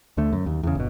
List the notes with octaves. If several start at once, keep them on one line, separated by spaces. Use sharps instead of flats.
D2 D3 A3
F#2
D#2
E2 C#3
G1 B2